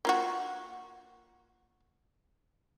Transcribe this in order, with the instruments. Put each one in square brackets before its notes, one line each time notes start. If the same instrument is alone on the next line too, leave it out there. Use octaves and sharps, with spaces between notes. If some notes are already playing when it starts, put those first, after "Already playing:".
[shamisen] A#3 F4 F#4